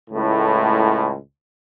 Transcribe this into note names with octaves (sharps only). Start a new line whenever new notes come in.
C#2 A2